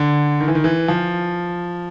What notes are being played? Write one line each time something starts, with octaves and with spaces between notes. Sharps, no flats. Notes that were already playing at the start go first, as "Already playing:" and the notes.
Already playing: D3
D#3
E3
D#3
E3
F3